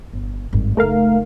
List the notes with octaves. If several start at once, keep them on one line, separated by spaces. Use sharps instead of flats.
G1
G#1 G2
F#1 A3 D#4 A#4 F5